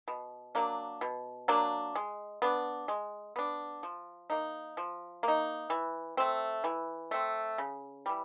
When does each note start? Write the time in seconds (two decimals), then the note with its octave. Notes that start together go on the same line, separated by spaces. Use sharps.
0.08 B2
0.55 F#3 A#3 D4
1.01 B2
1.48 F#3 A#3 D4
1.95 G#3
2.42 B3 D4
2.88 G#3
3.36 B3 D4
3.83 F3
4.30 A#3 D#4
4.77 F3
5.23 A#3 D#4
5.70 E3
6.17 A3 C4
6.64 E3
7.11 A3 C4
7.58 C#3
8.06 E3 G3